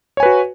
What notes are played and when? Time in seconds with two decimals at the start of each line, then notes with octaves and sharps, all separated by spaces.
0.17 C#5
0.20 G#5
0.23 B4
0.26 F#4